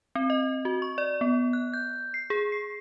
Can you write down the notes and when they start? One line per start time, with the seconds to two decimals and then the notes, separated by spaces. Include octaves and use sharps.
0.15 C4
0.30 D#5
0.65 F#4
0.82 C#6
0.98 D5
1.21 B3
1.53 F#6
1.74 G6
2.14 C7
2.30 G#4
2.52 C7